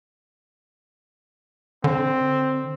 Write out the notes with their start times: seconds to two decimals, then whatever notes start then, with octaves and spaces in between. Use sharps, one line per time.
1.84 D3 C4